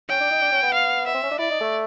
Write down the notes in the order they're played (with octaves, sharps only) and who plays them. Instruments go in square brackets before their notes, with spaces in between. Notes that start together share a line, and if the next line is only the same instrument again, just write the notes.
[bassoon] C#4 [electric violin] G5
[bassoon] D4
D#4
D4
C#4
B3
[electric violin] F5
[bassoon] B3 [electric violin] E5
[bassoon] C4
C#4
D4
[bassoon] E4 [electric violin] D5
[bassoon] D#4
A3